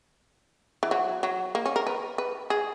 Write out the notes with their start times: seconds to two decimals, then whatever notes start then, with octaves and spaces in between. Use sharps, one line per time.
0.83 E3
0.91 F#3
1.23 F#3
1.55 A#3
1.66 C#4
1.76 A#4
1.87 B4
2.18 B4
2.50 G#4